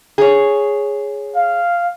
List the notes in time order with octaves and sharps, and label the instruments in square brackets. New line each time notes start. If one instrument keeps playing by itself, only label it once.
[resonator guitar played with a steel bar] G#4 C#5
[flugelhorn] F5